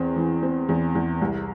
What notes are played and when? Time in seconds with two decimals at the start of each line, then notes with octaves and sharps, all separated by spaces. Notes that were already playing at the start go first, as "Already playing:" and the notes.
Already playing: E2 C4
0.16 E3
0.42 C4
0.69 E2
0.95 E2
1.21 C2